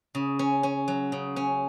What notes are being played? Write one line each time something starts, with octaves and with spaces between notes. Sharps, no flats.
C#3
C#4
C#4
F#3
C#3
C#4